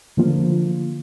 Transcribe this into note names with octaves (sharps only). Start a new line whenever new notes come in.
D3 F3 A#3 F4